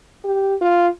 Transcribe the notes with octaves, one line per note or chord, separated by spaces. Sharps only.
G4
F4